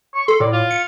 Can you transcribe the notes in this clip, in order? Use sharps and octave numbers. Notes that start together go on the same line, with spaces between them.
C#6
A4 C6
A2 D5
F4
C#7